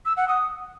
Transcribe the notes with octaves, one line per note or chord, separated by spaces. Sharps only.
E6
F#5
D#6